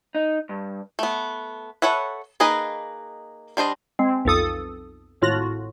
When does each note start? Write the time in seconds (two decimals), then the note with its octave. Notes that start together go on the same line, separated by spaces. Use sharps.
0.15 D#4
0.49 G2
0.99 A3 B3
1.82 A4 B4 C#5 E5 F#5
2.40 A#3 D#4 G#4 B4 D#5
3.57 G3 D4 C5 D#5
3.99 G#3 C4
4.25 B1 F2 A4 D#6
5.22 G#1 A2 F4 F#4 A#6